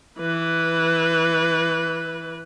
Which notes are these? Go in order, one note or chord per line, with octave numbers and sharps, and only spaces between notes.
E3 B4